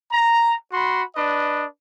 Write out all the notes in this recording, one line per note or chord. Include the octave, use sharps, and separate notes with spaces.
A#5
F#4 B5 C6
D4 B4 D#5